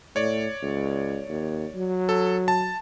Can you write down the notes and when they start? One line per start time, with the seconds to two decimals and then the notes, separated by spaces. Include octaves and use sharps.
0.16 A2 C#5 D5
0.63 C#2
1.28 D#2
1.75 F#3
2.09 A4
2.48 A5